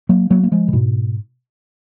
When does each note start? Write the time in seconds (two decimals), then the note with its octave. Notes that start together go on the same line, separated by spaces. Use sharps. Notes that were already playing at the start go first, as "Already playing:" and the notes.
0.09 F#3 A#3
0.30 F#3 A#3
0.43 A#3
0.52 F3 G#3
0.68 C#3
0.73 G#2 B2